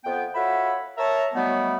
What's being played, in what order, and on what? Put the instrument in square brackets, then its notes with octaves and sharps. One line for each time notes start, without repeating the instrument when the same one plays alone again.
[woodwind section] F2 B3 G5
F4 F#4 A4 C#5 E5 B5
A#4 C#5 E5 A5 A#5
D#3 F#3 G3 A3 B3